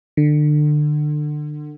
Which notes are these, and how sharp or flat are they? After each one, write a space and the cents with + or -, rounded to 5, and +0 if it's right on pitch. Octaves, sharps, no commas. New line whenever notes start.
D3 +30